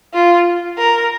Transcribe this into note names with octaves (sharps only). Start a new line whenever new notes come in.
F4
A#4